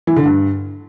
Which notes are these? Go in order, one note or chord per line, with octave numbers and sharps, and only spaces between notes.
E3
D3
G2